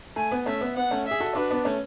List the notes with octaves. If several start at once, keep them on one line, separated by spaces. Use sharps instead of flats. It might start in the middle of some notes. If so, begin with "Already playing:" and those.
A3 G#5
B3
A3 C#4 E5
B3
B3 F#5
A3 C#4
E5
G#4
F#4 A4
D4 F#4 B4
B3 D4
A3 C#4